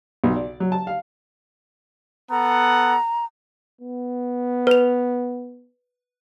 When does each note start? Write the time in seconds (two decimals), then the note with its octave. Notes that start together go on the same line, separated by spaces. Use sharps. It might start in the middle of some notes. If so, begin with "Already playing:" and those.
0.24 B1
0.36 D5
0.60 F#3
0.72 A5
0.87 F5
2.30 B3 A4 F#5 A#5
3.81 B3
4.67 B4 F7